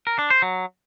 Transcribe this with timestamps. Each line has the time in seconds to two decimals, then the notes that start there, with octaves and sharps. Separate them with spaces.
0.07 A#4
0.19 D4
0.30 C5
0.42 F#3